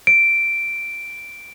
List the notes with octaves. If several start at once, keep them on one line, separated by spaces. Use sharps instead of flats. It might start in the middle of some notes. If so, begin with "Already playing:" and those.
D7